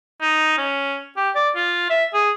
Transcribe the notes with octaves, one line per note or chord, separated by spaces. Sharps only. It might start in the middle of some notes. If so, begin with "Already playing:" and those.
D#4
C#4
G4
D5
F4
E5
G#4